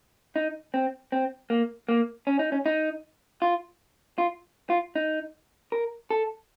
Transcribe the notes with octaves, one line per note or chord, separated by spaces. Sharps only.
D#4
C4
C4
A#3
A#3
C#4
D#4
C#4
D#4
F4
F4
F4
D#4
A#4
A4